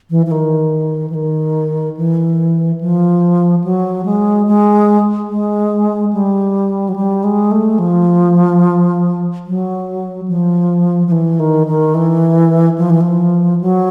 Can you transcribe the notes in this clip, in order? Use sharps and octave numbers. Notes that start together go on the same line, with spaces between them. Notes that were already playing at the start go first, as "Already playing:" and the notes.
E3
E3
D#3
E3
D#3
E3
F3
F#3
G#3
G#3
G#3
G3
F#3
G3
G#3
A3
F3
F#3
F3
F3
E3
D#3
D#3
E3
F3
E3
F3
F#3